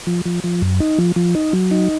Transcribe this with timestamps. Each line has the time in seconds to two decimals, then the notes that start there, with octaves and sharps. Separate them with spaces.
0.07 F3
0.25 F3
0.44 F3
0.62 F#2
0.80 D#4
0.98 F3
1.16 F3
1.35 D#4
1.53 F#3
1.71 D#4